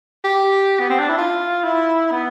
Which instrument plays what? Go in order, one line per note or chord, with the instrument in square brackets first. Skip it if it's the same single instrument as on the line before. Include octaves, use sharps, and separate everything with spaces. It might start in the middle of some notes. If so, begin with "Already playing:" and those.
[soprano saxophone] G4
B3
C4
D4
E4
F4
E4
B3